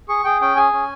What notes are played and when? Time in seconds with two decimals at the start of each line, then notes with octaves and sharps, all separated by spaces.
0.09 G#4 C#6
0.24 G#4 G5
0.41 C#4 G5
0.56 G#4 G#5
0.73 C#4